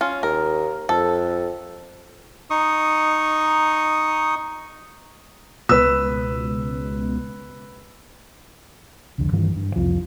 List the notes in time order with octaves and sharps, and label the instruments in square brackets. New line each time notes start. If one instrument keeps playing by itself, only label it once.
[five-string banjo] C#4 F4
[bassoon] D#2 [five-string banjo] A#4
[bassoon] F2 [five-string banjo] A4
[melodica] D#4 C#6 D#6
[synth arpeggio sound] C#2 B2 [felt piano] B4 E6
[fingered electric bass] C2 F2 D3
G2 D#3 E3 G3
G2
C2 F2 F3